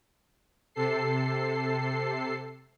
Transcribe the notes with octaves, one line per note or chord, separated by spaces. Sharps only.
C3 A4 C7